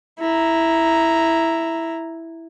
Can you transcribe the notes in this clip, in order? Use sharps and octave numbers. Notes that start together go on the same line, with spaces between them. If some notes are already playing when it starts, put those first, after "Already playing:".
E4 A#5